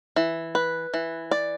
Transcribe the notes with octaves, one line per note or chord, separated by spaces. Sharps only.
E3
B4
E3
D5